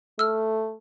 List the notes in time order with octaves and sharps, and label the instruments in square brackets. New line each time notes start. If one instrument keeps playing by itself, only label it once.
[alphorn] A3 [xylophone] E6 F6